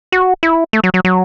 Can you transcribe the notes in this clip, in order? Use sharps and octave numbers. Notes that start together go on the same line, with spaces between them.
F#4
E4
A3
F#3
F#3
F#3